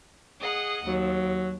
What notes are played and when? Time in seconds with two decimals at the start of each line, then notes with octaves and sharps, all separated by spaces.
0.42 G#4 D#5 F#5
0.86 D#2 F#3